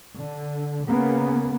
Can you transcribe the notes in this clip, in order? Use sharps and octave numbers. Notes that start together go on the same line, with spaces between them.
D3
C#3 A#3 B3